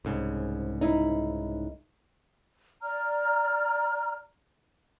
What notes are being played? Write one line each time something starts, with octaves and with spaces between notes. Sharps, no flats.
C2 G#2 C#3
D#4 E4
D5 A#5 F6